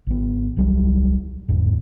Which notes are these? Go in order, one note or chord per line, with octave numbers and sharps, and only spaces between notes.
G#1 B3
D#1 C2 F#3 G3
G1 E2 G#2